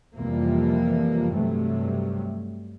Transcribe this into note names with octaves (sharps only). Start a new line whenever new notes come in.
F2 C3 E3 F3 G3 A#3
G2 C3 F#3 A3